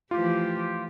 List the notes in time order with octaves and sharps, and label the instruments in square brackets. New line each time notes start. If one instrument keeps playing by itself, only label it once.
[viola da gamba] E3 F3 A3 [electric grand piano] F4 [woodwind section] G4